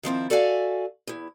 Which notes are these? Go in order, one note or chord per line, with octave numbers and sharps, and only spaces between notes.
D#3 F3 C4 E4
F#4 A4 D5 E5 F5 G#5
E2 E4